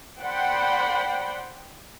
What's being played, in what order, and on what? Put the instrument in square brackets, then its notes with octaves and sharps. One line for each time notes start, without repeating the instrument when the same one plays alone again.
[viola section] C5 D5 F#5 G5 B5 C6